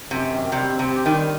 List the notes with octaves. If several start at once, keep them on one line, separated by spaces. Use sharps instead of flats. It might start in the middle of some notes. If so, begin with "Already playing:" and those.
F#2 C3
D#3
C3 G3
C4
C3
G4
D#3
G3